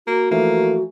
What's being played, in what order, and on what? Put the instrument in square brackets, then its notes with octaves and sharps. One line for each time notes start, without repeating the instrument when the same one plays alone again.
[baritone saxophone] A#3 [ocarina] F#4
[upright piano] E3 F3 A3 [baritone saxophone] A#3